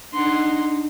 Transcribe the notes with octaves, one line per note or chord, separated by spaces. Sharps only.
D4 D#4 F#5 C6